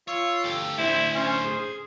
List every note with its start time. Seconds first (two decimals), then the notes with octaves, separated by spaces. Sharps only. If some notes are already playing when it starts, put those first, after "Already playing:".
0.08 F4 C#5 E6
0.44 D2 G4 A4
0.78 A2 D3 E4 C5
1.15 C#4 C5
1.45 G#4